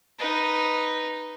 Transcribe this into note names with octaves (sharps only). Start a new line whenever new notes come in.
D#4 B4